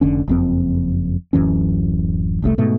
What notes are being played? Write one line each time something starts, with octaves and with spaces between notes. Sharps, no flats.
F1 D3 C#4
F#1 F2 C4
D1 F#2 E3 C#4
F1 C2 C3 A3
G#2 B2 A3